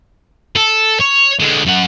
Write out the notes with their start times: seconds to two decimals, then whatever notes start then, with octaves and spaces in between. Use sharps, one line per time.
0.56 A4
1.00 C#5
1.40 D3 G#3
1.66 F#2 F#5